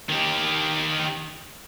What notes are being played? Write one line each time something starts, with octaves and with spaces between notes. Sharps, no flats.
D#3 G4